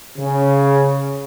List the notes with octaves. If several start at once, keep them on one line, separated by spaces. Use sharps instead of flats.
C#3